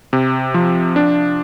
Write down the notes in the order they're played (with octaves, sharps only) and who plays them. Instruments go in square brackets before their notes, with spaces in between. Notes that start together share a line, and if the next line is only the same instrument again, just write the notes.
[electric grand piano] C3
F3
D4